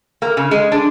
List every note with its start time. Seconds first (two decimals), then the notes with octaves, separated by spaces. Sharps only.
0.22 A#3
0.37 C#3
0.51 G#3
0.72 D4